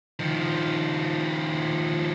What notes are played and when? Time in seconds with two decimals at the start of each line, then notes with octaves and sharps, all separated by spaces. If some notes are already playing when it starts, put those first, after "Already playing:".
0.19 D#3 F3